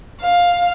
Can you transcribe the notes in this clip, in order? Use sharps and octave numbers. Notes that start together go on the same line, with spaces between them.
F5